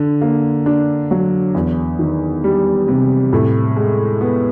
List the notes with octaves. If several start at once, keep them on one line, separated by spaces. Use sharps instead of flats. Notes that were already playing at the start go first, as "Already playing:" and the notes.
Already playing: D3
A#3
D4
F#3
E2
D#3
G3
C3
A2
G#3
B3